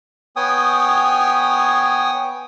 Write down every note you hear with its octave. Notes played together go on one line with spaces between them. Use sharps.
B3 C#5 G5 G#5 D#6